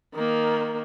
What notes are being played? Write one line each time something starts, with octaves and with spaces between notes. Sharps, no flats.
D#3 A#3